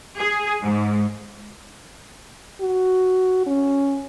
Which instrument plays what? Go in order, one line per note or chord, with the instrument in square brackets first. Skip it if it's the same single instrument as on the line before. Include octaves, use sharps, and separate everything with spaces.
[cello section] G#4
G#2
[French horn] F#4
C#4